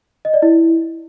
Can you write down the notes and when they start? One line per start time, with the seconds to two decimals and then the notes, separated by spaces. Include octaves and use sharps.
0.25 D#5
0.34 D5
0.42 E4